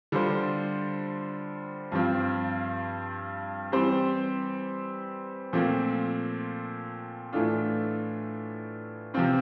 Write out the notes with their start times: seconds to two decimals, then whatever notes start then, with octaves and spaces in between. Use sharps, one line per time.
0.12 D3 G3 D4 F4 C5
1.92 G2 F3 C4 F4
3.72 E3 G3 C4 G4 C5
5.53 A#2 F3 A3 C4
7.33 A2 E3 A3 D4 F4
9.14 C3 F3 C4 F4